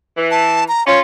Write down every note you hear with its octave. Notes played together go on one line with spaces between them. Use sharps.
E3
A5
A#5
C#4 F4 C#5